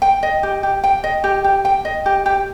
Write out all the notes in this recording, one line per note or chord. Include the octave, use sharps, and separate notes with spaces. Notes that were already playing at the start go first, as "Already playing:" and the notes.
G5
D#5
G4
G4
G5
D#5
G4
G4
G5
D#5
G4
G4